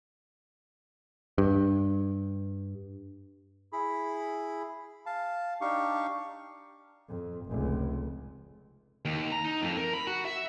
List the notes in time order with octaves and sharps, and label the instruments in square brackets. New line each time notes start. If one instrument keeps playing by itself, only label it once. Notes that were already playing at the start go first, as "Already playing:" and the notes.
[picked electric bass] G2
[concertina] E4 G#4 B5
F5 A5
D4 D#4 G4 F5 C#6
[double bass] F2
F1 C#2
[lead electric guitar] D#2
A#5
D#4
F2
A#4
B5
F#4
E5